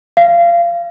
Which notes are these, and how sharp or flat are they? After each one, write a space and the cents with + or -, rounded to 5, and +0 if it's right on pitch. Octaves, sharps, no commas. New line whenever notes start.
F5 -25